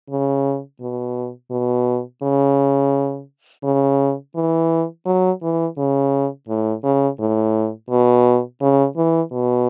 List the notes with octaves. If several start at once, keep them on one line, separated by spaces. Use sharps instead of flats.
C#3
B2
B2
C#3
C#3
E3
F#3
E3
C#3
A2
C#3
A2
B2
C#3
E3
B2